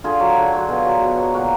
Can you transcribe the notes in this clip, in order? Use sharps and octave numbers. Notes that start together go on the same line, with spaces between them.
D3 F4 G#4
F#3
D3
F#3 F#4
B2 F4 G#4
F#3
B2
F#3
A#2 F#4 A#4